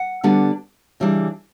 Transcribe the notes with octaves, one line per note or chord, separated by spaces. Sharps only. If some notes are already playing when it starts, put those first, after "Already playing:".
Already playing: F#5
D3 G3 B3 D4
C#3 E3 G3 D4